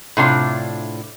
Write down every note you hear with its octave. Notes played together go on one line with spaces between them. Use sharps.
A2 C3 D4 F4